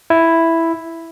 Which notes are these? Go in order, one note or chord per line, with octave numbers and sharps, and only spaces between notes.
E4